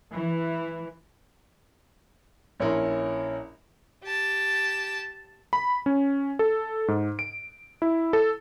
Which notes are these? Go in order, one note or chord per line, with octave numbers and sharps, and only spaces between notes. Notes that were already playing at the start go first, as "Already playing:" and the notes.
E3
A#1 C#4 E4 A#4 C#5 C6
G4 A5
B5
C#4
A4
G#2
D7
E4
A4